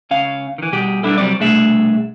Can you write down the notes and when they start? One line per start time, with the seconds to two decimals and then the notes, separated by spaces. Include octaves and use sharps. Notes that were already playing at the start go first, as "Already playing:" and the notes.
0.11 C#2 C#4 F5
0.58 D#3 E3
0.72 B2 G3 G4 G#4
1.03 G3 B3 D4 E4 A4
1.18 C2 F#3 G3 C4 D5
1.40 C2 B2 A3 D4 G#4 E5